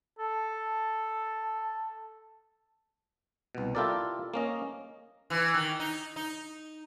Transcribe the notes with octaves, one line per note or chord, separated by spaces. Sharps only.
A4 A5
C2 B2
E4 F4 G4 A4 A#4 D5
A#3 C#4 D#5
E3
D#3
D#4
D#4